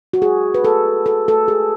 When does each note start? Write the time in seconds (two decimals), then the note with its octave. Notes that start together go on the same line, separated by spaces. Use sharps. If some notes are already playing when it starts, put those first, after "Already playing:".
0.13 F#4
0.22 G#4
0.54 B4
0.64 A4
1.06 A4
1.28 A4
1.48 G#4